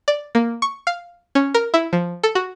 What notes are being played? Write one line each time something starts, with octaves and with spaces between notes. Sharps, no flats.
D5
A#3
C#6
F5
C#4
A#4
E4
F3
A4
F#4